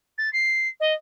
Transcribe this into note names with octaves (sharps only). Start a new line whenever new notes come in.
A6
C7
D#5